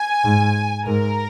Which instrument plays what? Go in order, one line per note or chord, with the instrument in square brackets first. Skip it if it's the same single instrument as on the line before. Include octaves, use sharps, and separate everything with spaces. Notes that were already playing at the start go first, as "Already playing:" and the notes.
Already playing: [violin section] G#5
[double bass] G#2
[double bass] G#2 [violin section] A#4